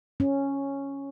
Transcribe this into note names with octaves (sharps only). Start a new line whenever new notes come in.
C#4